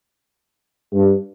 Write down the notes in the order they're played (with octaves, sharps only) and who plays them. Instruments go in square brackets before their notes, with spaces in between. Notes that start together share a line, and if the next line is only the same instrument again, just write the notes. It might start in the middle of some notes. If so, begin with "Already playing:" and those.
[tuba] G2